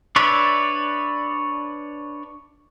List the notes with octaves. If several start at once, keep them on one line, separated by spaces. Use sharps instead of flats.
D4 B4 C#5 D5 E5